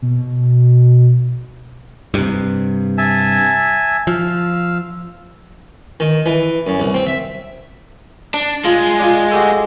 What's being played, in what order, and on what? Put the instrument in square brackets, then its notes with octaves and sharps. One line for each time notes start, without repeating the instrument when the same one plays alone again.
[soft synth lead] B2
[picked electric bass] G2 C3
[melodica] E5 G#5 A5
[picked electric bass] F3 [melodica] F5 E6
[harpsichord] D#3
E3
F#2
C2
C4
E5
[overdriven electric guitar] D4
[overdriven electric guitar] G#3 [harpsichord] F4
[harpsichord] D4 F4
F#4 G4 A4